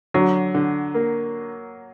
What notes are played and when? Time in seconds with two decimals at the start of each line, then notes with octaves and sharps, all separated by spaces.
0.14 D3 F#3
0.54 D3
0.94 A#3